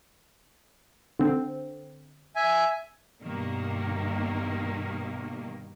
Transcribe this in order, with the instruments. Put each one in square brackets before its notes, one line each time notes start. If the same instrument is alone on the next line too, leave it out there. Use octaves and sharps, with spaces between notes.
[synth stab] D3 C4
[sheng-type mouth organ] E5 G#5
[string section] G2 B2 D#3 A#3